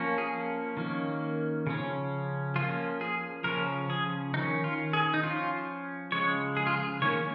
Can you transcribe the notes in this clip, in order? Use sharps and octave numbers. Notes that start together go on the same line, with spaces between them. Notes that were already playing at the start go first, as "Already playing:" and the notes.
Already playing: F3 A#3 C#4
G#4
D#3 A#3 C#4
C#3 F3 C#4
F3 A#3 C#4 F4
G#4
C#3 F3 C#4 A#4
G#4
D#3 C#4 D#4
F4
G#4
D#4
F3 C#4 F4
C#3 F3 G#3 C#5
G#4
F4
G#4
D#3 A#3 C#4 C#5